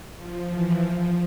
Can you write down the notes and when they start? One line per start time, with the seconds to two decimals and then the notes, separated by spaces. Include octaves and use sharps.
0.16 F3
0.50 E3
0.83 F3